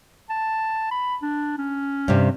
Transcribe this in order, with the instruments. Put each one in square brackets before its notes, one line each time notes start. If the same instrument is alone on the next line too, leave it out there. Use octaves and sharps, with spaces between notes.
[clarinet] A5
B5
D4
C#4
[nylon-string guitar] G2 C3